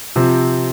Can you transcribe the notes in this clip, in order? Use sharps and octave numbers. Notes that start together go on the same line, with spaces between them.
C3 F3 C4